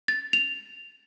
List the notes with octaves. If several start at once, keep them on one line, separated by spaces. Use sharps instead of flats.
A6
F7